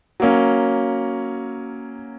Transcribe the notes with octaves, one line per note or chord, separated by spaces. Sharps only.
F#3 A#3 C#4